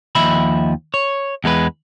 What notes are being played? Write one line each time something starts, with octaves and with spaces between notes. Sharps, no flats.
D#2 F3 D#5 E5 B5
C#5
E2 G#3 A4 B4